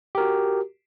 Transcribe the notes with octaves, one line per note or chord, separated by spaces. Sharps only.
F#4 G4 A#4